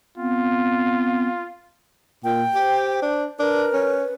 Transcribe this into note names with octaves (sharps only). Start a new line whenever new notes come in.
B3 C4 F4
A#2 G5
G4 C5
D4
D4 A#4 B4
C#4